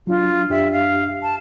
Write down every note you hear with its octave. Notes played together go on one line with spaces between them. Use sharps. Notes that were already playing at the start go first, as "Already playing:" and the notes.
F#3 D4 F4
F#2 D4 G4 E5
F5
A5